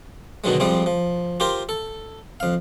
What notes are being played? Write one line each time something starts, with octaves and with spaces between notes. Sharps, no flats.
B2 D3 D#3 F#3 G#3
F2 F3 G3 G#3 C4
F3
F4 G4 A#4 C5
A4
F2 F5